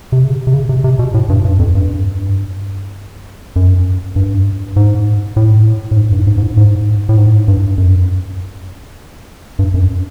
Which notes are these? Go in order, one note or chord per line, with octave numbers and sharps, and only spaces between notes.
C3
C#3
C3
C#3
C3
C3
B2
A2
G2
G2
F2
G2
F#2
G2
G#2
A2
A2
G#2
G2
G#2
G#2
A2
G#2
A2
G#2
G2
F#2
G2
F#2